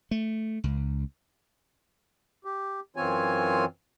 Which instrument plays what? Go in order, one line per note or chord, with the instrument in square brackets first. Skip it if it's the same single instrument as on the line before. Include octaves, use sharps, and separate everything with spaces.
[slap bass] A3
C#2
[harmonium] G4
F#2 E3 C4 F4 C#5 G#5